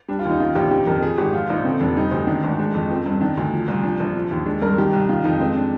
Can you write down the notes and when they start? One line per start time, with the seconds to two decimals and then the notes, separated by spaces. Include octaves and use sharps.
0.08 G3 D4
0.19 F4
0.25 D#2 D#4
0.40 D#3 F4
0.55 A#1 G4
0.71 D#3 G4
0.87 F2 A#4
1.02 F3 G#4
1.17 G#1 G4
1.33 F3 F4
1.50 A#1 D#4
1.64 D3 C4
1.80 F1 D4
1.96 G3 D#4
2.11 D2 C5
2.27 D#3 D4
2.43 G#1 D4
2.59 G#3 D4
2.74 F2
2.90 F3 C4
3.06 G2 C4
3.21 D#3 D4
3.37 D2
3.53 F3
3.68 C2
3.83 F3 D4
4.00 A#1
4.16 F3
4.31 D#2
4.46 G#3 D4
4.62 G2 A#4
4.78 D#3 G4
4.93 C2
5.09 D#3 F4
5.24 F2 D#4
5.40 G#3 C4
5.56 D4